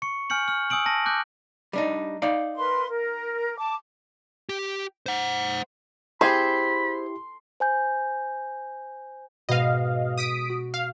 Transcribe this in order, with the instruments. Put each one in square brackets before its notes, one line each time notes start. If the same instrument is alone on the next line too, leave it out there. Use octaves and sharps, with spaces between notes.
[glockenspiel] C#6 C#7
G#5 F6 G6 C#7 F#7
F6
G#5 D#6 E6 D7 F#7
A5 A#6
D6 F#6 G6
[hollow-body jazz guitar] G3 D4 D#4
D#4 D5 F5
[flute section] A#4 B4 C6
A#4
A5 D6
[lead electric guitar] G4
C5 F#5
[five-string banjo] C4 G#4 [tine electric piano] E4 G4 [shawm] B5 [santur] C6
[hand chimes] C5 G#5 G6
[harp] G#2 B2 [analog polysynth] D#5 F5
[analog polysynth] D#6 B6 D7 [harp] G6
[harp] F#4
[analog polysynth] F5